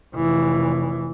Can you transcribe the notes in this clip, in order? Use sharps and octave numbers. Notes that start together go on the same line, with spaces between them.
F1 E3